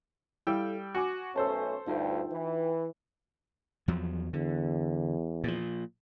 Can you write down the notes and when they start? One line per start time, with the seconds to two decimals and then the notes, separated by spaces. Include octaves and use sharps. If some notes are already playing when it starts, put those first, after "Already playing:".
0.47 G3 E4 A4 F5 G5 E6
0.95 F#4 G#5 C#6 D6
1.36 B1 A3 C#4 A4 C5 A5
1.87 D2 G2 D#4 F4 G5
2.32 E3
3.88 E2 F3 F#3
4.33 E2 D3
5.44 A#2 F3